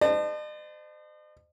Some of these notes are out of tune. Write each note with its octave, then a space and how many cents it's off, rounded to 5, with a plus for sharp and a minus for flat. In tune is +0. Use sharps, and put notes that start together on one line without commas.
C5 -35 D#5 -45 A5 +0